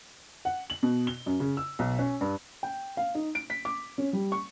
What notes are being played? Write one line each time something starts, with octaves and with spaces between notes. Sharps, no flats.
F#5
F#7
B2
G7
F#2
C#3
E6
B1
C#4
G2
G5
F5
D#4
D7
B6
D6
C#4
G3
C#6